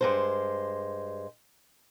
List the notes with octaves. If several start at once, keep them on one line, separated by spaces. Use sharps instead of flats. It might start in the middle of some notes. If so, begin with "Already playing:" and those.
G2 G#3 C5